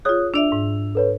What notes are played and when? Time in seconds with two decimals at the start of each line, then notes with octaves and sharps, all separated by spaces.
0.05 F4 G#4 C#5 D#6 F#6
0.34 D4 D5 E5 E6 F7
0.52 G#2
0.95 A4 B4 C#5